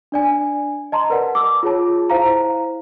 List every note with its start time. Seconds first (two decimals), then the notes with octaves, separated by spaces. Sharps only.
0.12 D4 D5 G#5
0.92 D#5 A5 A#5 C6
1.10 A#4 B4 D5 F#5 A5
1.35 D6 E6
1.63 F4 G#4 C#5 A5
2.10 E4 C5 F5 A#5